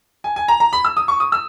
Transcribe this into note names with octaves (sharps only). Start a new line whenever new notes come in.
G#5
G#5
A#5
A#5
B5
E6
D#6
C#6
D#6
E6